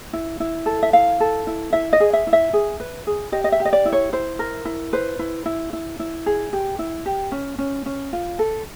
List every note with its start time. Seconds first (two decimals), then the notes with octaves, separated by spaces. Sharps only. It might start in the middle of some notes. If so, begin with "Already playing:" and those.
0.13 E4
0.40 E4
0.66 A4
0.83 E5
0.93 E4 F5
1.20 A4
1.47 E4
1.73 E4 E5
1.93 D#5
2.00 G#4
2.13 E5
2.27 E4
2.33 E5
2.53 G#4
2.80 B4
3.07 G#4
3.32 G4 D#5
3.44 D#5
3.52 E5
3.60 G4
3.65 D#5
3.73 D5
3.85 E4
3.93 C#5
4.13 E4 C5
4.39 A#4
4.65 E4
4.93 B4 C5
5.19 E4
5.46 E4
5.73 E4
6.00 E4
6.26 G#4
6.53 G4
6.79 E4
7.06 G4
7.32 C#4
7.58 C#4
7.86 C#4
8.13 F4
8.39 A4